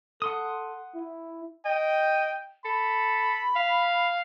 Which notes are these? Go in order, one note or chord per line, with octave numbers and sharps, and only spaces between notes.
A4 F#5 C6 D#6
E4
D#5 G5
A4 B5
F5